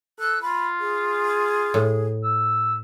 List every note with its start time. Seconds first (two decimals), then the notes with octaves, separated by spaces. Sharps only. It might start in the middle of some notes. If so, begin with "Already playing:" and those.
0.19 A4 F#6
0.42 F4 B5
0.80 G#4
1.74 A2
2.24 E6